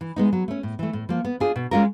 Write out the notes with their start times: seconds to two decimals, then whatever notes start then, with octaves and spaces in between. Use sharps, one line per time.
0.01 E3
0.16 G#3 B3 D#4
0.33 F#3
0.48 A3 C#4
0.63 A2
0.79 E3 A3
0.93 A2
1.09 F3 A#3
1.25 B3
1.40 D4 F4 G#4
1.56 B2
1.71 G#3 C#4 F4 A#4